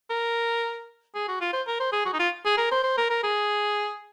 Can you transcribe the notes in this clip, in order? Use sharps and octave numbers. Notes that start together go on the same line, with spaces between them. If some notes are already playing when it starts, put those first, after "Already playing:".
A#4
G#4
F#4
F4
C5
A#4
C5
G#4
F#4
D#4
F4
G#4
A#4
C5
C5
A#4
A#4
G#4